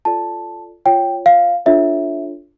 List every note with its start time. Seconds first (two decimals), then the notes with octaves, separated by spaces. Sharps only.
0.05 F4 A4 D5 A5
0.85 F4 C#5 G5
1.26 F5
1.66 D4 F4 A4 C#5 E5